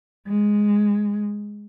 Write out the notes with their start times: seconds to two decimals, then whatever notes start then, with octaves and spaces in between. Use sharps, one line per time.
0.27 G#3